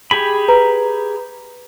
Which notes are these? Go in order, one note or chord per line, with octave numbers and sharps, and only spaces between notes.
G4 G#4 B5
B4 A#5